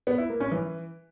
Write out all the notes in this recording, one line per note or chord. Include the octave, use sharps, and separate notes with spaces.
B3
E4
A#3
C#4
E3